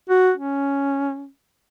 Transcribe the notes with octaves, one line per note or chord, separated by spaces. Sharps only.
F#4
C#4